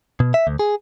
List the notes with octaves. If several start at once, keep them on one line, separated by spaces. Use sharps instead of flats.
B2
E5
D2
G#4